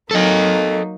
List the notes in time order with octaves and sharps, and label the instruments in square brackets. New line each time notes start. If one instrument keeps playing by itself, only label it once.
[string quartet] F#3 A#3 D#4 [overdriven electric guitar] A4 D#5